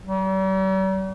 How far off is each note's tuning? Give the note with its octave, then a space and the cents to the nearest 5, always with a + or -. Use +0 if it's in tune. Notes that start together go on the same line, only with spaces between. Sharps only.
G3 -45